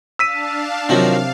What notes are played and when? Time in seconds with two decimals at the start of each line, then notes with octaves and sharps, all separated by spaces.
0.19 D4 F5 A5 E6 B6 D#7
0.89 C3 D#3 F3 F#3 F5